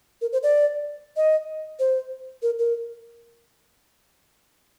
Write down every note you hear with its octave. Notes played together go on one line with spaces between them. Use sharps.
A#4
C5
D5
D#5
C5
A#4
A#4